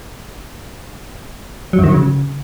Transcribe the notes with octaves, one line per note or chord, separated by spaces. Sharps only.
F#3
F#2
D#3
F#3
C#3